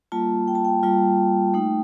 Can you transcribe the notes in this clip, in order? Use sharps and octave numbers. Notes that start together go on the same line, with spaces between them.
G3 A#3 F4 A5
G5
A5
G5
G3 A#3 F4 G5
A3 D#4